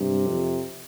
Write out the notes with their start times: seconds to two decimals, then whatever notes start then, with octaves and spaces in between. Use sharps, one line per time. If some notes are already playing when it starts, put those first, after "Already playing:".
Already playing: G2 C3
0.26 F2